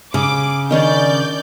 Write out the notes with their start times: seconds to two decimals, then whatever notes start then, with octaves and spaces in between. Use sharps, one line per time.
0.14 C#3 D6
0.70 D#3 C#4 D4 D5 G6